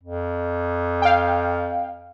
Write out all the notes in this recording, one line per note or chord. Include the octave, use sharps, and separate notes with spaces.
F2
F5 G5